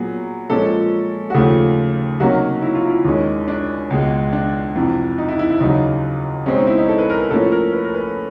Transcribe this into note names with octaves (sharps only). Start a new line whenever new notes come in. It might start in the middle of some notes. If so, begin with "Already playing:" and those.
Already playing: A#2 F#3 B3 G#4
A#2 F3 G#3 C#4 A4
F#4
D#2 C#3 F3 A3 G4
C3 D#3 F#3 A#3 C#4 F#4
E4
F4
E4
D#2 D#3 G#3 C#4
D4
C#2 B2 G#3
D4
F2 C3 E3
D#4
E4
E4
E4
D#2 C#3 F#3 D#4
B2 G#3 C4 C#4
D#4
E4
D#4
A4
B4
A#4
B4
A2 F3 A#3 C#4 A4
A#4
B4
A#4
B4